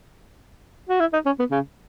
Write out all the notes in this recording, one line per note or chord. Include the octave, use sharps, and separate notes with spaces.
F#4
E4
D#4
C#4
B3
C#3